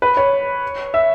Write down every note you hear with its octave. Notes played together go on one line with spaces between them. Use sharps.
B4
C#5
E5